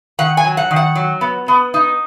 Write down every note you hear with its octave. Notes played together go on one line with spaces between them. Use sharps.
D#3 F#5
G#5
F#3
F#5
D#3
F#5
F#3
B3
B3
D#4